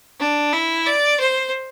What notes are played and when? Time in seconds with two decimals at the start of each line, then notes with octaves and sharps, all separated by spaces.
0.20 D4
0.53 E4
0.86 D5
1.20 C5